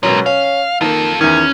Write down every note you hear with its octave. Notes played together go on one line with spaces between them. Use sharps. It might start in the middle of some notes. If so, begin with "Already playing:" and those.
B2 F#3 G#3 C#4 A#4
C#4 F5
D#3 A#3 F4 A4
E2 D#3 C#4